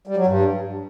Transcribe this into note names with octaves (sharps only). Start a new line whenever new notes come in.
G3
F#3
G2